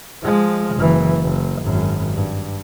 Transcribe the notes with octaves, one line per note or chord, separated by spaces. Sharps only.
F3 G#3
F#1 E3
F#1
G#1 F#2
G2